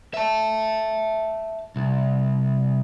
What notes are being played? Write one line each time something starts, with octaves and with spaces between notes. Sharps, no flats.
E5 A5
C2